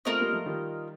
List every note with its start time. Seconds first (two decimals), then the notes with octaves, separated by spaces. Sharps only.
0.05 A3 C4 F4 A#4 D#5
0.19 G3 A#3
0.32 F3 A3
0.46 D#3 G3